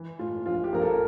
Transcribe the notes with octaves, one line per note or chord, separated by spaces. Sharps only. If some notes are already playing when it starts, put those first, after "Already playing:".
Already playing: E3
A2 F4
A#1 F4
G4
A#1 A#4
A4